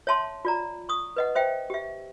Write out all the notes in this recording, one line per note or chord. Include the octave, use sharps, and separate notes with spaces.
C#5 E5 A5 C6
F4 D5 A#5
C#6 D#6
B4 D#5 F#5
C5 E5 G5
G4 E5